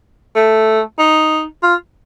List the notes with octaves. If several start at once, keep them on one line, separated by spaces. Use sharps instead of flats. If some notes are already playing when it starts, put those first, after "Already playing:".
A3
D#4
F4